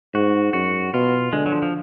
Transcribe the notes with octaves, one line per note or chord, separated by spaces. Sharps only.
G#2 F#4
F#2 F#4
B2 F4
D3 G#3
F#3
F3
F3